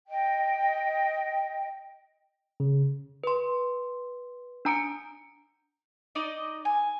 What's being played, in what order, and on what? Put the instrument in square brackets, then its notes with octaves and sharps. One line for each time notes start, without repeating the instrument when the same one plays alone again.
[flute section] D#5 G5
[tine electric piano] C#3
[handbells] B4 C6
D4 G#5 A#5 D#6 C#7 D7
[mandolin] D#4 D5 D#5
G#5